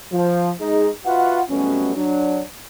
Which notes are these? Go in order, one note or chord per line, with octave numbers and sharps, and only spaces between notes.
F3
G#3 D#4 G#4
F4 F#4 B4 E5 F#5
F2 B2 F#3 G3 A3 C#4
F#3 D4